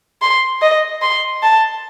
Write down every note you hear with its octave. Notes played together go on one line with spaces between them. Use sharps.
C6
D#5
C6
A5